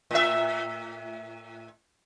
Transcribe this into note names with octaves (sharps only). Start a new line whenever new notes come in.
A2 E5